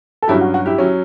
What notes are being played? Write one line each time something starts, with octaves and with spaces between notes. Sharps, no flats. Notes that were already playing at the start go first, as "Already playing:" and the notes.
A4
G2 F#3 C#4 E4 G4
F#4
F#4
E4 G4
F#3 C#4